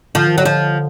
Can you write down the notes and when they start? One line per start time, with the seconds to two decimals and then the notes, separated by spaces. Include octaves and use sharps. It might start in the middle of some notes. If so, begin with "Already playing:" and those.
0.15 D3 F3
0.27 D#3
0.38 D3 F#3
0.45 F3